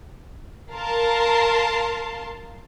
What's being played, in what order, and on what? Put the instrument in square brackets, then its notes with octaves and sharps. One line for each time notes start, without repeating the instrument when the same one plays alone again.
[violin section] A#4 F5 A5 C6